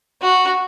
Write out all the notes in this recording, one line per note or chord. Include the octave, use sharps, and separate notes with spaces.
F#4